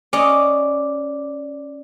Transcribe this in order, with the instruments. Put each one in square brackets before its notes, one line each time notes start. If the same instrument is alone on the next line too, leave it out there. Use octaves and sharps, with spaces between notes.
[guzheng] C#4 D#5 [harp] D5